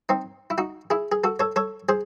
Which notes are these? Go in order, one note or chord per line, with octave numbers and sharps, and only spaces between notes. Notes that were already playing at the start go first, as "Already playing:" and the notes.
C4 D#4
E4
D#4 F#4
E4 G#4
G#4
F#4 A4
A4 C#5
A4 C#5
G#4 C5